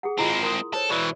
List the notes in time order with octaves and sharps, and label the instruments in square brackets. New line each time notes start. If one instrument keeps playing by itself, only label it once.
[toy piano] G#4 A4 F#5
[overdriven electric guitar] G#3 C4 [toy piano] E4 F4
[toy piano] A#4 C6 D#6
[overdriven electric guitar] A4 [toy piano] C5 C#5
[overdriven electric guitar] B2 E3 [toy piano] D5